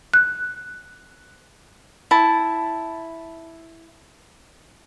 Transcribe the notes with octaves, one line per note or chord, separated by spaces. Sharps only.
F#6
E4 A5